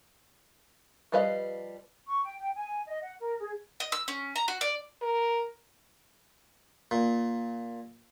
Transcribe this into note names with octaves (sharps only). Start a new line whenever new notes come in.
F3 G3 B4 D#5 F5
C#6
G5
G5
G#5
D#5
F#5
A#4
G#4
D#5
E6
C#4
A#5
F#4
D5
A#4
A#2